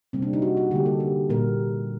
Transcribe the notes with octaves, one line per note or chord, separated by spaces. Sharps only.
C3 G3 A#3 C4
D4
D#4
F#4
F#4
D3 G3 A#3 G4
A4
G4
A#2 G3 A#3 A#4